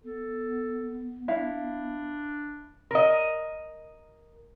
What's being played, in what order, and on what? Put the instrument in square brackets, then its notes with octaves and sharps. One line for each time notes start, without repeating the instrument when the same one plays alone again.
[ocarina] B3 [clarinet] A4
[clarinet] D4 [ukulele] E4 F5
[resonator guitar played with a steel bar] A#4 D#5